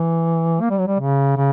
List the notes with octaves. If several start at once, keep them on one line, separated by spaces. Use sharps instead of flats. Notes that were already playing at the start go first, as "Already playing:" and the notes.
Already playing: E3
A#3
G3
F#3
G3
C#3
C#3